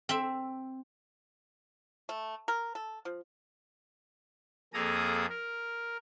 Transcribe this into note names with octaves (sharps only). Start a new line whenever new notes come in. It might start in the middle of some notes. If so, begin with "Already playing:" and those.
C4 E5
A3
A#4
A4
F3
F2 A#3 G#4 A4 A#5 D#6
A#4